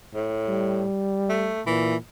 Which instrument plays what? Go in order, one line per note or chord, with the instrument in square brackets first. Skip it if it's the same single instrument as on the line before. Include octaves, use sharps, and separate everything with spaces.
[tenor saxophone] A2
[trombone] G3
[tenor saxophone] A3
[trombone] A#2 [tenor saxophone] E3